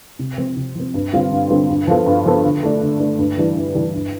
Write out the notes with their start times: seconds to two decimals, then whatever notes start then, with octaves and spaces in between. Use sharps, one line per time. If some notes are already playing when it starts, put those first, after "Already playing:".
0.19 C3
0.38 F3 C4
0.56 C3
0.75 F3 C4
0.94 G2
1.13 D3 G3 C4 F4
1.31 G2
1.50 D3 G3 C4 F4
1.69 G2
1.87 F3 B3 F4 A4
2.06 G2
2.25 F3 B3 F4 A4
2.44 D3
2.63 A3 D4
2.81 D3
3.00 A3 D4
3.18 G2
3.37 E3 G3 D4
3.56 G2
3.75 E3 G3 D4
3.93 G2